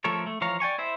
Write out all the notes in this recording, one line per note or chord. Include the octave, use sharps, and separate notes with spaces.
F3 A3 A4 A#4 C#5
A3
E3 F3 C#5 F5 A#5
D5 G5 G#5 C#6
E4 C5 E5